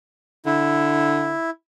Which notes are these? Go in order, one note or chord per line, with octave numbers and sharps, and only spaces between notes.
D3 E4